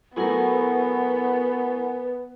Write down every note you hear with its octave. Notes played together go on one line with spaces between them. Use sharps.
A2 F#3 A3 B3 A#4 B4 F#5 G#5